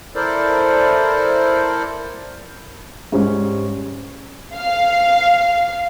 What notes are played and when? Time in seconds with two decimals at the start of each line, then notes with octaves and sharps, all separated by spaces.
0.15 E4 A4 A#4 C5 D5
3.12 G#2 G3 C#4
4.56 F5